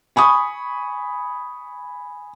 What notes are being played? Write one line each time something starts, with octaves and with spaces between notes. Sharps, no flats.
G#5 B5 C#6 D#6